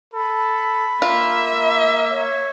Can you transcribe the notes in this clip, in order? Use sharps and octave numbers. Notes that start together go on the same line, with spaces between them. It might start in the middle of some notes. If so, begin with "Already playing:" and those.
A4 B5
A#3 F4 E5
C#5